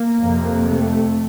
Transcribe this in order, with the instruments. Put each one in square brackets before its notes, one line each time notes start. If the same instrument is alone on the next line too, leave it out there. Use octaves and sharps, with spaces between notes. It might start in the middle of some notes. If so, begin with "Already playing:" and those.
Already playing: [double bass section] A#3
F2 C3
A3